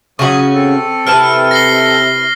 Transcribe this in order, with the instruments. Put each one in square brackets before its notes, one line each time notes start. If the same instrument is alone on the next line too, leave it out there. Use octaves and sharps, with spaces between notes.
[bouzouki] C#3 C#4 F#4 [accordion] F#3 D#6 [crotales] C#6
[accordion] C4 A4
[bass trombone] C3 [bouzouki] E4 B4 A5 [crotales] F6
[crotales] A#6 C7 G7